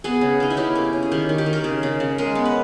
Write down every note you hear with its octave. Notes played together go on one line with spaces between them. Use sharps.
B3 G#4
C#3
C#3 D#4
E4
C#4 G4
A#3
C#4
G#4
D#3 G4
D#3
G4
D#3
A#4
C#3 G#4
C#3
C#3
G#3 A#4
B3
B4